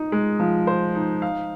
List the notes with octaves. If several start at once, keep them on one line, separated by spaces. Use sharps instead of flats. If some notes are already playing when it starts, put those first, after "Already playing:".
Already playing: D#4
G#3
F3
C5
D#4
F5